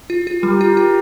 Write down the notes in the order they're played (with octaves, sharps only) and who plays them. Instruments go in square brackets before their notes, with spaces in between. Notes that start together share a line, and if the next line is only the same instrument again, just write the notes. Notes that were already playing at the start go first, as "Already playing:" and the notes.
[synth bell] F4
F4
[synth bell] G3 [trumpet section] G4 A#4
[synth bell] F4
F4